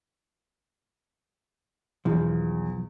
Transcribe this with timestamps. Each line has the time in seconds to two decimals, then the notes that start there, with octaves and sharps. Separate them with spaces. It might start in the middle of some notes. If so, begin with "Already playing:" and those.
2.05 B1 E2 F3